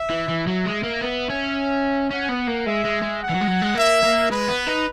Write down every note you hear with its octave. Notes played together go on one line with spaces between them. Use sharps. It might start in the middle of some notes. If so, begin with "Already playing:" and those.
Already playing: E5
E3
E3
F#3 E5
G#3
A#3
B3
C#4
C#4 F#5
B3
A#3
G#3 E5
G#3
G#3
F#5
E3
F#3
G#3
F#3
G#3
A#3 E5
A#3
G#3 B4
B3
D#4